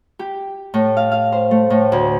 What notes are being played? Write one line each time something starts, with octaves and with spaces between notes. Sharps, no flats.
G4
A2
F5
F5
C5
A3
A2
D2